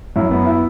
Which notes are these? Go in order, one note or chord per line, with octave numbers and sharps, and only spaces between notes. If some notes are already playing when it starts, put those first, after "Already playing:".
F#2 E4
B3
E4